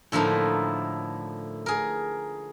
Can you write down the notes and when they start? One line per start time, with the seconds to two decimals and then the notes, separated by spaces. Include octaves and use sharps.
0.12 A2 D3 F3 A#3 D#4 E4
1.66 G#4 A#4